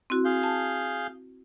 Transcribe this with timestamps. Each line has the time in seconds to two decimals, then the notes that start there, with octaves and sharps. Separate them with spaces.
0.10 C4 E4 F#4
0.25 G#4 F5 G6
0.43 A5